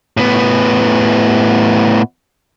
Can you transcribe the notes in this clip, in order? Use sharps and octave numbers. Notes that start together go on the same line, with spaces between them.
A2 B3